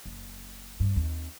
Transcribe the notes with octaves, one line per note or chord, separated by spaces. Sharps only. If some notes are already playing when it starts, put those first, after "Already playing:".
F#1
G2
D#2 C4